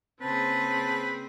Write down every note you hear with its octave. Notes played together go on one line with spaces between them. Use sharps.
C#3 A#3 C4 G#4 B4 C5 A5